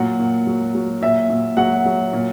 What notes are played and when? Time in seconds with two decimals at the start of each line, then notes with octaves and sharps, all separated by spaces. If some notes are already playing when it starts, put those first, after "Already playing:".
Already playing: A#2 F#3 F#5
0.19 A#2
0.47 F#3
0.75 F#3
1.01 A#2 E5
1.29 A#2
1.57 F#3 F#5
1.86 F#3
2.13 A#2